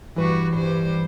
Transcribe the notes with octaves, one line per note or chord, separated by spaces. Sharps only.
G2 E3 G3 F#4 B4
G2 G3 C5